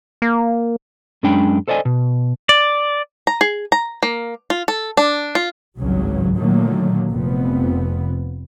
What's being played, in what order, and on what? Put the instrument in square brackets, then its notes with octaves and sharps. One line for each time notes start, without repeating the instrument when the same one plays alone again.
[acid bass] A#3
[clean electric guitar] F#2 G#3 C#4 D4 G5 B5
A4 C5 D5 D#5 G#5
B2
[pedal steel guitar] D5
[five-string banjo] A#5
G#4
A#5
A#3
F4
A4
D4
F4
[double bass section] G#1 C#2 G2 C#3 F#3
A#2 D3 D#3 F#3 A3 A#3
F1 F2 B3